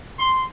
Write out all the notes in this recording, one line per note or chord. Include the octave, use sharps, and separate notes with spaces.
C6